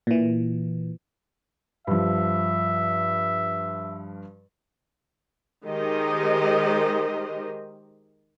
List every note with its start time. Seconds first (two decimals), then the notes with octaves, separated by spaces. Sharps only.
0.07 A#2 E3
1.87 G2 F3 E5
5.65 D#3 G#3 G4 A#4 C5 D#5